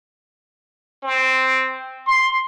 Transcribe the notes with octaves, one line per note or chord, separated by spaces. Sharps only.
C4
C6